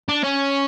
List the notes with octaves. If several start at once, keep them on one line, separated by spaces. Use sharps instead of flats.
D4
C#4